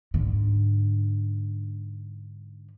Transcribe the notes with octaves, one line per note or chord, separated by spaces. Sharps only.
G#2 D3